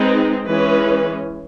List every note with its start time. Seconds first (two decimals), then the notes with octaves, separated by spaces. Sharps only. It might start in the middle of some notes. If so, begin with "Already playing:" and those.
Already playing: G#3 C4 D#4 B4
0.48 E3 G#3 C#4 B4